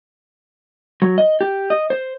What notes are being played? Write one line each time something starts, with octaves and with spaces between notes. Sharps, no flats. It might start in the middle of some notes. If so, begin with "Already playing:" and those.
F#3
D#5
G4
D#5
C5